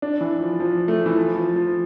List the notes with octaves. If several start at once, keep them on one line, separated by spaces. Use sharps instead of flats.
D4
E3
F3
F3
A3
E3
F3
F3
F3